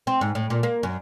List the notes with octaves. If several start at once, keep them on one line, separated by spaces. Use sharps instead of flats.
C4
G#2
A2
A#2
A#3
F#2